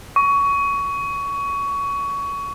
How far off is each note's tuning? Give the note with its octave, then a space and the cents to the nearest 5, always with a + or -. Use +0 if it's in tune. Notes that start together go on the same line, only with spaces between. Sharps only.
C#6 +20